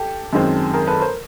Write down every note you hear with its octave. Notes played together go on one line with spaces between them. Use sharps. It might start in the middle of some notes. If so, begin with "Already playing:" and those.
Already playing: G4 A4
F#2 D#3 G#3 C4
G#4 A#4
A4 B4
A#4 C5